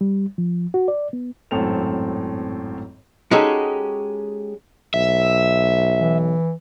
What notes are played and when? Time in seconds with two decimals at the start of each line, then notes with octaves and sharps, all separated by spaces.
0.01 G3
0.38 F3
0.74 F#4
0.88 D5
1.13 B3
1.51 G#1 F#2 A2 C4 A4 F7
3.31 G#3 C#4 D#4 F#4 G4 A4
4.94 B1 E5
6.00 E3